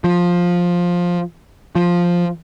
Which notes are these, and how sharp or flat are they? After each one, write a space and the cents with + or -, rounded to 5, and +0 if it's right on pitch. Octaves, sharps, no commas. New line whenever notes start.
F3 +10
F3 +5